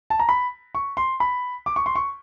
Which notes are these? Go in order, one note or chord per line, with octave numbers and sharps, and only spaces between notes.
A5
A#5
B5
C#6
C6
B5
D6
C#6
C6
C#6